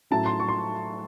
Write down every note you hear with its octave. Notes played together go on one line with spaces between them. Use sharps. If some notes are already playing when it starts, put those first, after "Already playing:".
A2 F#3 C#4 E4 A5
C6
C#6
C6